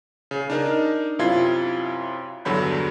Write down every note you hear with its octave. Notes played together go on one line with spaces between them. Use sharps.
C#3
D4 D#4 A#4
F#2 C3 E4 F4 G#6 C7
E2 G2 D3 F#3 B5 G6